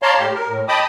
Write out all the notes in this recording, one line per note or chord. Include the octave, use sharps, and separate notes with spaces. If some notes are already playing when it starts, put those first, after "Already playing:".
C#5 D5 F5 A5 A#5 C6
A2 G4
A#4
A2
D#5 G5 A5 B5 D6 D#6